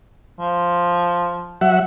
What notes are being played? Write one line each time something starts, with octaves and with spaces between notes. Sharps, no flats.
F3
F#3 E5 F#5